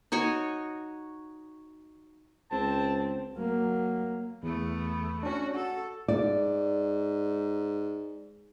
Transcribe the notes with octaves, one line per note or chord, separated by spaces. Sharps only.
D#4 F#4 C#5 G#5
C#2 C4 A5
F#3 A#3
E2 A3 B3
C#4 D4 F#4
F#4 A4
G#2 D5